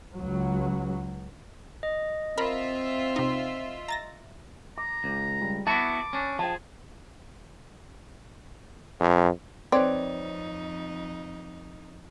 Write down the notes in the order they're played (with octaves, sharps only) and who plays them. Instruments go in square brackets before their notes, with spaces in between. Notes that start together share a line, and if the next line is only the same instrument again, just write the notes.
[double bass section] C#2 F#3
[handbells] D#5
[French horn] C4 [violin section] F4 E5 [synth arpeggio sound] A#4 B5
[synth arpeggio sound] C3 D#4
A#5 A6 A#6
[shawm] A#5 [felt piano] D6
[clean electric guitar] C#2
[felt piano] G3
[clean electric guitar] B3 E4 F#4 [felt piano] A5 B5 [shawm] D6
[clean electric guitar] C#4 D4
[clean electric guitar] F3 [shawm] G#4 [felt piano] G5 A5
[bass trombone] F2
[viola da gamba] F2 D#4 [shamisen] C4 [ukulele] B4 C#5 D5